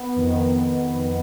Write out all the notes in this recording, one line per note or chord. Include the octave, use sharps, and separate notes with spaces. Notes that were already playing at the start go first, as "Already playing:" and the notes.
Already playing: B3
F2 D#3